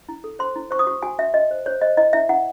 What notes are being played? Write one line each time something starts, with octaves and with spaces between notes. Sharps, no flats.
E4
A4
C5 C6
E4
C5 C#6
D#6
F#4 C#6
F#4 G#5
F#4 E5
F#4 D#5
C5
C5 C#5
C5 D#5
E4 D#5
E4 E5
E4 F#5